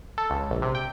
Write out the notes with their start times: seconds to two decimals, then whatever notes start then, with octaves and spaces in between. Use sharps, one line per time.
0.18 A4
0.30 C#2
0.50 A#1
0.62 C3
0.75 G5